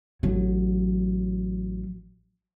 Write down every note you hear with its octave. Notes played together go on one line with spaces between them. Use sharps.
A1 F#3